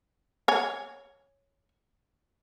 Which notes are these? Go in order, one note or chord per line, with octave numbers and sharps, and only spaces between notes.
C#5 G#5